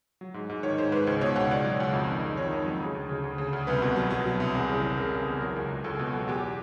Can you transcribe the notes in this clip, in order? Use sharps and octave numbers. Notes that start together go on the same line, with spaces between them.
F#3
G#2
G#2
D#3 C#5
G#2 C5
G#2 B4
C#2 C5
B2 C#5
C#2 F#5
C#2 D5
F#3
C#2
F2
D#3
F2
D#3 C#5
F2
F#3
C#3
D2
C#3
D2
C#3
D2
C2 B4
B2
F#3
F#3
B2
C2
E2
C#3
C#3
C#3 A#4
C#3
E2
F#3 A#4
C#2
C#2
C#2 A4
B2
F#3
E2 G4